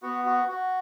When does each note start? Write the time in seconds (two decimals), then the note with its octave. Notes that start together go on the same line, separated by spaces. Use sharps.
0.02 B3 F#4
0.25 F#4
0.49 F#4